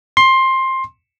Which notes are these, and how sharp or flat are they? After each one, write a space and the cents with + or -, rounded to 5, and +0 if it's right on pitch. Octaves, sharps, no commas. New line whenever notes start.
C6 +15